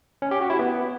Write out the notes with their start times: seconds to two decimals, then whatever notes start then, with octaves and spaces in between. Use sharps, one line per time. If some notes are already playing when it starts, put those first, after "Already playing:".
0.22 C#4
0.31 G4
0.41 F#4
0.50 E4
0.59 B3